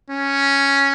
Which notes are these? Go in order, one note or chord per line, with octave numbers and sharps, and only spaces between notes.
C#4